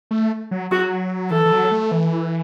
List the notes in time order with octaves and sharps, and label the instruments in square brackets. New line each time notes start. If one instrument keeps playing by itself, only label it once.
[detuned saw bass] A3
F#3
[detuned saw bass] F#3 [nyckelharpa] F#4
[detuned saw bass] E3 [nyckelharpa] A4
[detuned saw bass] E3
F#3
A3
E3